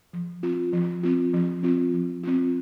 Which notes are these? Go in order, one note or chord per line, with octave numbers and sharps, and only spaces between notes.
F3
C4 F4
F3
C4 F4
F3
C4 F4
F3
C4 F4